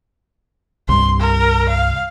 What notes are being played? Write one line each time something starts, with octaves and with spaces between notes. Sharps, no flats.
C2 G2 C6
A#4
F5